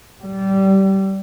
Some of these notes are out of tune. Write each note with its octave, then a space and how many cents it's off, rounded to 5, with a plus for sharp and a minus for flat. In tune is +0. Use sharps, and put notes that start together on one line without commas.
G3 -20